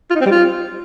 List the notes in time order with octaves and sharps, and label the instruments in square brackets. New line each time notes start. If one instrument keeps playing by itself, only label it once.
[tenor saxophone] F4
D#4
C4
G3
F4